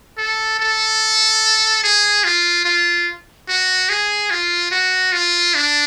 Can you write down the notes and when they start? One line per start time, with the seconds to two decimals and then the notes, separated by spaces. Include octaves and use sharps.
0.18 A4
0.60 A4
1.84 G#4
2.24 F4
2.65 F4
3.49 F#4
3.89 G#4
4.31 F4
4.72 F#4
5.13 F4
5.55 D4